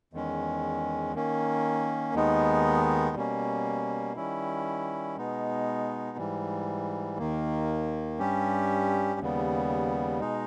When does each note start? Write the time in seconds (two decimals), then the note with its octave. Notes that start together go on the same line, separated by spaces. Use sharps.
0.13 E2 D#3 G#3 C#4
1.14 D#3 A#3 C#4
2.14 D#2 D#3 G#3 B3 D#4
3.16 B2 G3 A#3 C#4
4.16 D#3 G3 C#4 E4
5.17 B2 G#3 B3 D#4
6.18 G#2 E3 G3
7.19 D#2 D#3 A#3
8.19 G2 G3 C#4 G4
9.20 D#2 C#3 G3 B3
10.20 B2 G#3 D#4